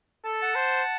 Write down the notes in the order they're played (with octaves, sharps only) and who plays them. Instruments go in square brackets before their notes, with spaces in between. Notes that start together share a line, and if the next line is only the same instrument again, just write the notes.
[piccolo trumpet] A4 [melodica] A5
[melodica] F#5 A5
[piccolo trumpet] C5